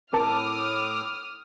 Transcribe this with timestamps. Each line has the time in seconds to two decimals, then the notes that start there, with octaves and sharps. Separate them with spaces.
0.13 A2 C4 A#4 A5 D6 D#6 F6